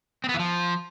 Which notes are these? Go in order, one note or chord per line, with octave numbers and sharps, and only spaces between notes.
C4
B3
E3
F3